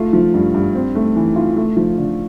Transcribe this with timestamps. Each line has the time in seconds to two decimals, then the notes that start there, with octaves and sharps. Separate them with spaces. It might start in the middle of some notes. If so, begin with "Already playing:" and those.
Already playing: A3 F4
0.13 F3
0.34 G2
0.54 G2
0.75 C4
0.95 A3
1.16 E3
1.36 F4
1.57 A3
1.76 F3
1.98 D3